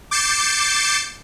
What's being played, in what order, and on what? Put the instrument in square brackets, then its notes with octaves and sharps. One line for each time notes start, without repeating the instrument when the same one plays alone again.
[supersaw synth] D6 G6 A6 C7 C#7 E7